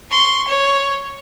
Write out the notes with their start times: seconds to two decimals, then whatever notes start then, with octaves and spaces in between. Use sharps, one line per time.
0.10 C6 C#6
0.47 C#5